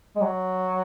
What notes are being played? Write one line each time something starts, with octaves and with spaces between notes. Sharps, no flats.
G#3
F#3